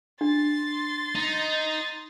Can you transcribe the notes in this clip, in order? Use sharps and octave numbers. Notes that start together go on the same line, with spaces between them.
D4 C6 A6
D#4